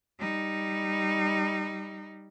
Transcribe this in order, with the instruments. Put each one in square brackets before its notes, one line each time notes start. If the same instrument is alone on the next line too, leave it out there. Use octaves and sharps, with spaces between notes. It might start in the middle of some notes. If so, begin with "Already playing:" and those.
[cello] G3 D#4